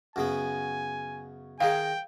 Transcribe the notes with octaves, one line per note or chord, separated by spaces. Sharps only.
F#2 C#3 B3 G#5
D#3 D#4 G#4 F5 G5